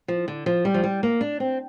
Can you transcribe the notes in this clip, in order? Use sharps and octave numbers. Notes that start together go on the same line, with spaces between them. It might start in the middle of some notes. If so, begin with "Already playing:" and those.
F3
D3
F3
G3
F3
G3
A#3
D4
C4